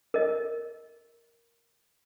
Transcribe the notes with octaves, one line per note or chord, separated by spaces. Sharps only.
A#4 D#5